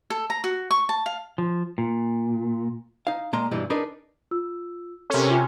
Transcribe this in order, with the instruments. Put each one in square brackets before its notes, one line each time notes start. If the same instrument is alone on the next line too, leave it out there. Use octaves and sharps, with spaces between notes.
[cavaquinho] A4
A#5
F#4
C#6
A5
F5
[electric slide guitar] F3
A#2
[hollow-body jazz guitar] D#4 F5
A#2 G#3 A#3 A#5 C6
G2 B2 E3 G3 D#4
D4 D#4 G#4 A#4 B4
[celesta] F4 E6
[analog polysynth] C3 C#4 [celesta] A4 A#4
[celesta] F4 G#5